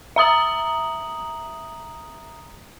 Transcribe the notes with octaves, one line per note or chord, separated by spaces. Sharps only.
E5 A#5 D#6 F#7